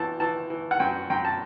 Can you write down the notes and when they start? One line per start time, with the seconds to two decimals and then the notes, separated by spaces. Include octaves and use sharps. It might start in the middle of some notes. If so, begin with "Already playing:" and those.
Already playing: E3 A5
0.20 E3 A5
0.50 E3
0.71 F#5
0.80 F#2 G5
1.10 F#2 G5
1.25 A5